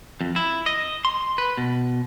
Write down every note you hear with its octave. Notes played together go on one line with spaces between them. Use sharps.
F2
E4
D#5
C6
B4
B2